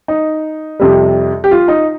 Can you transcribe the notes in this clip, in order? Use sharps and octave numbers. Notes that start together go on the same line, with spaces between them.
D#4
F2 C3 G3
G4
F4
D#4